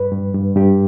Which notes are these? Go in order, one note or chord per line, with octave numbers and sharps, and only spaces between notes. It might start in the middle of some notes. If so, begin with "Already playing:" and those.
Already playing: G2 B4
G2
G2
G2 G4